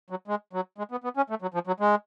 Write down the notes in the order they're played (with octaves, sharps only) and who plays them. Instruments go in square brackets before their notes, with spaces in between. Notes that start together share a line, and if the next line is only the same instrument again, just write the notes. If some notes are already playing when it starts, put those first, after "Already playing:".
[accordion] F#3
G#3
F#3
G#3
B3
B3
C#4
A3
F#3
F3
F#3
G#3